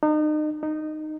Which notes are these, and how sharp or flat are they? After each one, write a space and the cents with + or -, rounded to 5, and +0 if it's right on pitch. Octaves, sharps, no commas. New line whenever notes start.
D#4 -35
D#4 -15